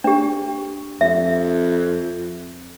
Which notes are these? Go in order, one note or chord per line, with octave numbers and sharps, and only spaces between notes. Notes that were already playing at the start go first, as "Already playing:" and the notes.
D4 G4
F2 E5